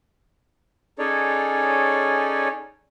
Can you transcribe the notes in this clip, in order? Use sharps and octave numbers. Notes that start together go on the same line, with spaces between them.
C#4 D#4 G#4 A4 C#5 D5